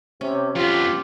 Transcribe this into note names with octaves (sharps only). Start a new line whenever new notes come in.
C3 C#4
F2 B3 F4 G4